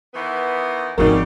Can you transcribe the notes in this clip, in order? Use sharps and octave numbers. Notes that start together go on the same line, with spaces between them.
D#3 E3 B3
G#1 F2 C#3 G3 D#4 F#4 A#4